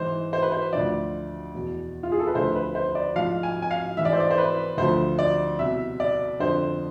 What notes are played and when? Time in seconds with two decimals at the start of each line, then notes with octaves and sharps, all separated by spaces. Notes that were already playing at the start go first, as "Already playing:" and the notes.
Already playing: G#2 E3 C5
0.33 C5
0.42 B4
0.52 C5
0.73 D2 D3 F3 D5
1.54 E2 B2
2.03 F4
2.12 G#4
2.20 A4
2.27 B4
2.35 D2 D3 F3 C5
2.55 B4
2.75 C5
2.95 D5
3.16 G#2 F3 F5
3.43 G#5
3.62 G#5
3.71 F5
3.97 G#2 E3 E5
4.05 D5
4.13 C5
4.20 D5
4.31 C5
4.38 B4
4.77 D2 D3 F3 C5
5.19 D5
5.59 C2 B2 E5
6.00 D5
6.40 F2 D3 F3 C5